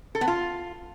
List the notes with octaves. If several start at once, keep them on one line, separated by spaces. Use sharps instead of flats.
A4
B3
F4